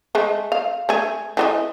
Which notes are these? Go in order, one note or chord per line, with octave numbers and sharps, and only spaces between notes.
G#3 A3
F5
A3 G#4
E3 F#4 D#5